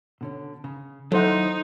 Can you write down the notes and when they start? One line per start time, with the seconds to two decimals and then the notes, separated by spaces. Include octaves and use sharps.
0.21 B2 D3 C#4
0.64 C#3
1.12 D#2 F#3 C#4 D#4 E4 A4 C5 F#5